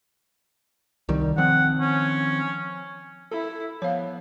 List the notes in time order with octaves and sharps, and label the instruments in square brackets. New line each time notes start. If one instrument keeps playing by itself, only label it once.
[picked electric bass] C2 D#3 G3
[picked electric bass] D#3 F3 C4 [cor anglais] F#5
[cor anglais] C#4
[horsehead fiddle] E4 [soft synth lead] A4
[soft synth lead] F3 [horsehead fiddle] B3 [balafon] C#5 F5